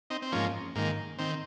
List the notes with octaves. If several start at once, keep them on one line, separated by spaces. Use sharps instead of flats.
C4 D#4
C4
G#2 F3 A#3 C#4
G#2 D#3 A#3
D#3 C4